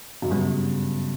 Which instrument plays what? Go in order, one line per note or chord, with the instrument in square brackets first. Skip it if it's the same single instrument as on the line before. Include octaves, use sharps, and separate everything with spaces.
[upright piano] F#2
[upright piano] G2 [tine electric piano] C#3 F#3 B3